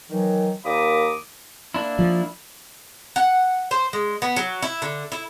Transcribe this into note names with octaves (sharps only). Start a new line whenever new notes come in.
D#3 E3 F#3
D#2 A#3 A#5 B5 D6 D#6
A#3 D4 E4
F3
F#5
C5
G#3
B3
F#3
E4
D3
E4